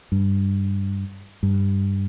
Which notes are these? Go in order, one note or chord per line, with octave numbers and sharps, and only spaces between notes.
G2
G2